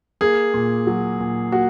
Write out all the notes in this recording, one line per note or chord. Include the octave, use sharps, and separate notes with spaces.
A#3 G#4
A#2
F#3
A#2
A#3 F#4